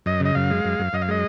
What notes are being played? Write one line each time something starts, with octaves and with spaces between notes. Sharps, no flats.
F#2 D#5
C#3
D#5
F#2 F5
G#3
F#2
F#2
F#2 D#5
F5
G#3 D#5